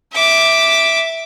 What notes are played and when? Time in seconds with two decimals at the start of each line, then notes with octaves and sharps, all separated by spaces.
0.13 E5 D6